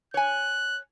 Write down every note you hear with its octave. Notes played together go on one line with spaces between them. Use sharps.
C#5 G#5 F#6